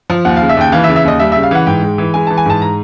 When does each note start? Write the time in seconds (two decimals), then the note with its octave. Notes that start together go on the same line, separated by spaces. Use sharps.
0.10 F3
0.25 D#2 F#5
0.37 C#3 F5
0.49 E5
0.57 D#2 G5
0.72 E3 F5
0.84 E5
0.88 C#3
0.96 E5
1.05 D#2 D#5
1.19 G3 E5
1.32 C#3 E5
1.43 F5
1.51 E3 F#5
1.67 G#2 G5
1.82 G#3
1.98 E3
2.14 G#3 G#5
2.27 E3 A5
2.37 G#5
2.46 G#2 A5
2.62 A#5